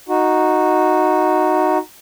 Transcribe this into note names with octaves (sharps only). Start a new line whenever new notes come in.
D#4 F#4